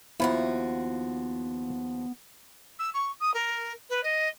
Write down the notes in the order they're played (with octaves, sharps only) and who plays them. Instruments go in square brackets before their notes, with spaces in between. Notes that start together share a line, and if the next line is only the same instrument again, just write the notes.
[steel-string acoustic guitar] D#2 F3 F#4 [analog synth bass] B3 [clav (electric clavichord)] E4
[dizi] E6
C#6
D#6
A#4
B4
D#5